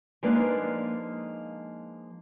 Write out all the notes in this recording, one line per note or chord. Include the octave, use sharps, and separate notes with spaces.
F3 G#3 A#3 D4 D#4 B4